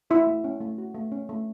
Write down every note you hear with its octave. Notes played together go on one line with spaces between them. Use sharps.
E4 F#4 E5
A3
C#4
A3
F#4
A3
C#4
A3